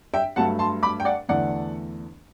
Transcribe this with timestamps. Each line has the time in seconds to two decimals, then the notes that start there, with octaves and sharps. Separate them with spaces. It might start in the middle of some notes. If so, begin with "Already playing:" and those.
0.14 E5 G5
0.36 G2 F#3 A3 F#5 A5
0.59 A5 C6
0.83 B5 D6
1.00 G5
1.05 D5 F#5
1.29 E2 D3 A3 D5 F#5